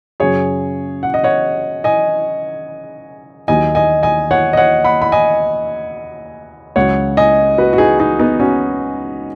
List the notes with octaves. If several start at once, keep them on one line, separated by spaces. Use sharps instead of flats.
F#2 C#3 F#3 G#4 C#5
F#5
D#5
C#5 F#5
D#5 G#5
D#2 D#3 F#3 D#5 G#5
D#5 G#5
D#5 G#5
C#5 F#5
D#5
C#5 F#5
F#5 B5
B5
D#5 G#5
C#2 C#3 F#3 C#5 F#5
D#5 G#5
F#4 B4
F#4
D#4 G#4
D#4 G#4
B3 D#4
C#4 F#4